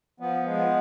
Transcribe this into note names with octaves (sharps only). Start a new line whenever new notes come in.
F3 B3
G#3
B3